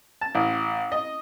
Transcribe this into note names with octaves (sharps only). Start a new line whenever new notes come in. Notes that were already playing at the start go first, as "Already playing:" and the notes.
A5
A1
D#5